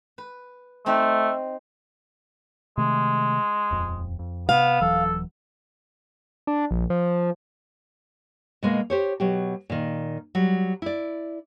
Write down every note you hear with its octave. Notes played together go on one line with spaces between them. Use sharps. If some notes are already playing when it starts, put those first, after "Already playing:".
B4
A3 C4 D#4
C3 D#3 G#3 A3
D#1 F2
F2
C3 B3 F5
D#1 E3 F#3 A4
D4
A#1
F3
B2 G#3 A#3
G4 C5 C#5
B2 F#3 G4
A#2 D#3
F#3 G3
E4 D5